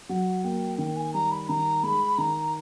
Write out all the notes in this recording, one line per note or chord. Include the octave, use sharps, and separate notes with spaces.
F#3 F#5
A#3 G5
D#3 G5
G#5
G3 A#5
B5
D#3 A#5
G#3 B5
D#3 A#5